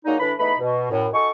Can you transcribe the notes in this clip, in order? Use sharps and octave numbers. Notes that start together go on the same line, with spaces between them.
F#3 G#3 A#3 D4 D#4
A2 E3 D4 B5
E2 A3 D#4 B4 B5
B2
F#2 A2
D#4 F#4 A4 G#5 C#6